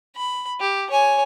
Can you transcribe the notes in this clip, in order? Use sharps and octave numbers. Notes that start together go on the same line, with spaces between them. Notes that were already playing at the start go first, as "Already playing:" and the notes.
B5
G4
C#5 G#5